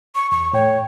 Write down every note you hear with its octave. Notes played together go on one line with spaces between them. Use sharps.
C#6
E2 C#6
A2 C#5 G5